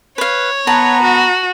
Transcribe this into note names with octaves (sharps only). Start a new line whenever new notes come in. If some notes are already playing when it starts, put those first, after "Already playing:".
B4 C#5 F5
B3 F#5 A5 A#5
F#4